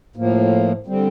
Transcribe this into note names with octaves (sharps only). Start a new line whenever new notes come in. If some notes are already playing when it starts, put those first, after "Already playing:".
A2 F3 A#3
D3 G3 C4